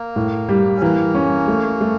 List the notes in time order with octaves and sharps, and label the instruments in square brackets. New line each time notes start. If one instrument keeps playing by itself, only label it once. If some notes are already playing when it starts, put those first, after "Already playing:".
Already playing: [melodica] A#3
[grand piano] A2
G3
[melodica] C#4
[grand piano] E3 [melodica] A#3
[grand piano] C#4
A3
A3